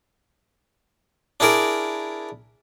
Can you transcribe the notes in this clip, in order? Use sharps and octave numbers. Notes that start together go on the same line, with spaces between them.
D4 E4 G#4 A#4 D5